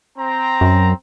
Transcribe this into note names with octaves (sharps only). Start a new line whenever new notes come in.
C4 A#5
F#2